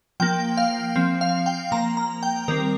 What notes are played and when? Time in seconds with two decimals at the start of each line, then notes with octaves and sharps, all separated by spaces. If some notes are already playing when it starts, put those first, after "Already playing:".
0.20 F3 A#3 G5
0.57 F5
0.96 F3 C4
1.21 F5
1.46 G5
1.72 F3 A#3 A#5
1.97 A#5
2.23 G5
2.48 D#3 G3 C4 A#4